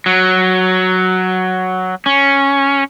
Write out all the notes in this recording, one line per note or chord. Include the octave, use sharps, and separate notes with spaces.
F#3
C#4